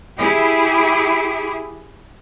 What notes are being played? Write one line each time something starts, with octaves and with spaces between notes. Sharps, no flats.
E4 G4 G#4